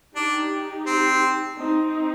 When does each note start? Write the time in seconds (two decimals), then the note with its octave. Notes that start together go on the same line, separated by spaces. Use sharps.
0.16 D4 D#4 G4
0.87 C4
1.57 C4 D#4